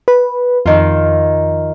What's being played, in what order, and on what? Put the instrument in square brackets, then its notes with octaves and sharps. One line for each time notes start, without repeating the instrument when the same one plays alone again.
[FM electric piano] B4
[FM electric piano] F2 [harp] D#3 F4